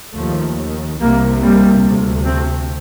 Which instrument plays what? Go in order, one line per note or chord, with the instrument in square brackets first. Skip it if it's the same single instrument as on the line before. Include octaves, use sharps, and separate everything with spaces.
[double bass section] D#2 F3 A3
C2 C3 G3 A#3
G3 A#3
D2 C3
A3 C4